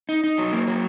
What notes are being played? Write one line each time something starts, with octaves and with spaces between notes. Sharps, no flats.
D#4
D#4
F#3
A#3
F#3